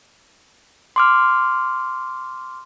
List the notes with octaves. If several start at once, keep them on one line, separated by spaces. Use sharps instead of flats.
C6 D6 F6